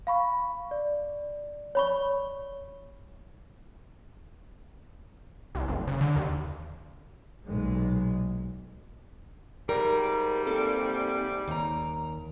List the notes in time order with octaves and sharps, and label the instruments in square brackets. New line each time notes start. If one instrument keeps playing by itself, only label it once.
[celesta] F5 B5 C#6
D5
[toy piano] C#5 B5 C#6
[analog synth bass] C2
F#1
C#3
D3
D#2
[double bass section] B1 A#2 G#3
[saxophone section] G#2 C3 G3 [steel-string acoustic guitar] A#4
[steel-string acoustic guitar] A#3 C4 A4
D#2 A#5